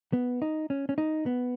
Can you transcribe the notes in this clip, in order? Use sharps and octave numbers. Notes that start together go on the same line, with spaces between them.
B3
D#4
C#4
C#4
D#4
B3